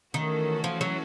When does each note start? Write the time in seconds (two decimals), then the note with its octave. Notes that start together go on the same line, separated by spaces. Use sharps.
0.14 D#3 E3 A3 C#4 F#4 A4
0.64 F3
0.81 F#3